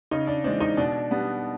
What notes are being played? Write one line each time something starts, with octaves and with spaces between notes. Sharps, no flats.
C#3 D#4
D4
E3 G#3 C4 D4
D#4
B2 D4
G3 B3 D4